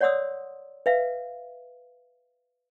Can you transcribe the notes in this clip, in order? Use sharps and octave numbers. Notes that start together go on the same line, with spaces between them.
C#5 D5 F#5 C6 D#6 E6
B4 E5 F5